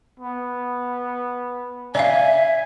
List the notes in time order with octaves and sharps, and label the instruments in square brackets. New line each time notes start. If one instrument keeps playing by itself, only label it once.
[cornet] B3
[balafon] D5 F5 [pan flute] E5 [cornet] G#5